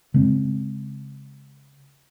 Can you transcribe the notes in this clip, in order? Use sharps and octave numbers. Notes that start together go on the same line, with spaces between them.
C#3 G#3 C4